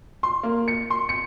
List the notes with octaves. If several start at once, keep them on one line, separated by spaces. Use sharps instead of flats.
C6
A#3
C#7
C6
C#7